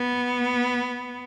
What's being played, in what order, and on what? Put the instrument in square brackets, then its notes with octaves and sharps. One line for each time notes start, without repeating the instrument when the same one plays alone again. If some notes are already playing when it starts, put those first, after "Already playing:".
Already playing: [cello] B3